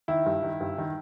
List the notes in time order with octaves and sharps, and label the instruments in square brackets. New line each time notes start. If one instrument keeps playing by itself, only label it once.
[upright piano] D#3 E4
G2
D#3
G2
D#3